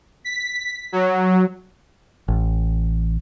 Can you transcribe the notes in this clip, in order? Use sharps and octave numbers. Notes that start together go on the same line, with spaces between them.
B6
F#3
A1